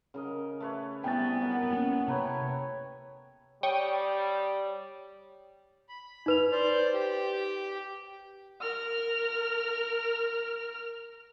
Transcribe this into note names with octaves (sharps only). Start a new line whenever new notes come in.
C#3 A#4 D#5
A3 B4 C#5
C3 G3 B3 E4 G5 G#5 A6
F#3 F#4 A#4
A#3 C#4
C3 A3 B4 C#5 G5 A#5 B5
G3 C#5 G5 C#6 D#6
B5
D#4 B4 F7
C5 D5
G4
A#4 F6